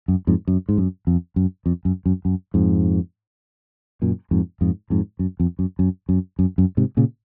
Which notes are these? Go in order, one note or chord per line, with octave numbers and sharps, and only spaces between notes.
F#2
F2 G#2
F#2
G#2
F#2
F2
F#2
F2
F#2
F#2
F#2
F2 G#2
F#2 A#2
F2 G#2
F2 G#2
F2 G#2
F#2
F2
F#2
F#2
F#2
F#2
F#2
G#2 C3
A#2 C#3